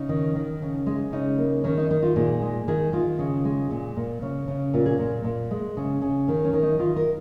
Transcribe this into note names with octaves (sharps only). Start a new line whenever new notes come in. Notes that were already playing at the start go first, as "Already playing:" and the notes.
Already playing: C#3 D#4
D#3
D#3
C#3
G#3
C#3 D#4
A#3
D#3 C#4
D#4
D#3 D#4
F4
A#2 G#4
G#3
D#3 G#4
D#3 F4
C#3
G#3
A#2
A#2
C#3 C#4
C#3
A#2 F4
G#4
A#2
A#2
G#3
C#3
C#3
D#3 C#4
C#4
D#3
D#4
D#3 F4
A#4